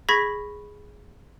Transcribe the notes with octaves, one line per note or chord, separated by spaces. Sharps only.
G#4 B5 C#6 G#6 A#6 B6